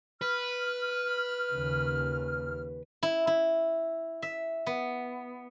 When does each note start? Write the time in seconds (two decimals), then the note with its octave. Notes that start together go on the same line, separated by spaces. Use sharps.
0.21 B4 F6
1.50 D#2 C#3
3.03 E4
3.27 E4
4.22 E5
4.67 B3